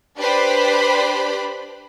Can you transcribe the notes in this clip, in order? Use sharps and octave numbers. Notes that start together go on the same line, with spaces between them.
D4 G4 B4 C5 B5